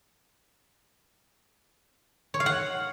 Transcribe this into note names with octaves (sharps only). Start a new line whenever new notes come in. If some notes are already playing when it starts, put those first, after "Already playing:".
C#5
F5
F#5